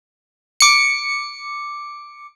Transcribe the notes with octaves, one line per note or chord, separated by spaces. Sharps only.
D6 C#7